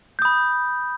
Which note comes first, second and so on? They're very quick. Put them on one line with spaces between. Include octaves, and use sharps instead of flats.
G6 D#6 B5